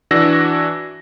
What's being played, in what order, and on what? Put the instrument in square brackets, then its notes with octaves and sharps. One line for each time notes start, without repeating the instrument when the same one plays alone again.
[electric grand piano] E3 D4 F#4 E6 A#6